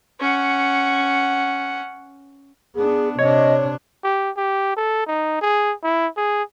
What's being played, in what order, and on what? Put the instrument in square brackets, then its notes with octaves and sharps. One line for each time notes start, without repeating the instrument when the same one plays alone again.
[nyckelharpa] C#4 F#5
[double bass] B3 D4 [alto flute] G#4
[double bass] C3 D4 [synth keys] C#5 [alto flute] D#5
[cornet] G4
G4
A4
D#4
G#4
E4
G#4